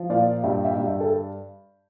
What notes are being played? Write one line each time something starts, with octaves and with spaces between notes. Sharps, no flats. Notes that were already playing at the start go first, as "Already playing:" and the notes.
Already playing: F3
A#2 D5 F5
G2 E5 G5
E5 G5
G2
E5 G5
A4